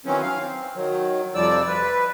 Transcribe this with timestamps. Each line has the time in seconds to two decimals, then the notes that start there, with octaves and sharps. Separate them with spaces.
0.06 D#3 E3 F#3 C4 C#4
0.22 F5
0.41 C4
0.75 D#3 F#3
1.35 F2 C3 F3 G3 D5 E6
1.68 B4